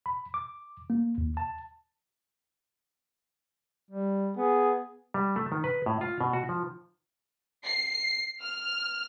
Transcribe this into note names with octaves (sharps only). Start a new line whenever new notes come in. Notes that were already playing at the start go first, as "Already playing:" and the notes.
B5
D6
A#3
D#2
A5
G3
B3 G#4
G3
A3
D#3
B4
A2
F4
B2
F#4
F3
C7
F6